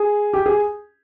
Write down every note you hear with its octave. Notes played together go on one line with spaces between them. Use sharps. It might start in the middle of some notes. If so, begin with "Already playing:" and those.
Already playing: G#4
G4
G#4